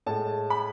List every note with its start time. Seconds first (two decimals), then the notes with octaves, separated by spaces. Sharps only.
0.06 A2 G#3 A5
0.50 B5